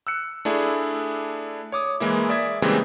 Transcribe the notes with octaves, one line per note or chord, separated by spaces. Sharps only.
E6 F#6 C#7
A3 D4 E4 G#4
C#5 D6 D#6
E3 G#3 A#3 E4
D5 E5 D#6 G#6 B6
C#3 E3 G3 G#3 A#3 C4